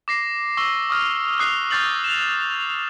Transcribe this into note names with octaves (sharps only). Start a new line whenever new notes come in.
D6 A#6 C7
C#6 E6 A#6 G7
C#6 D#6 F6
D#6 F6 F#6 C7
C#6 F6 G6 A6 C7 F#7
E7 F7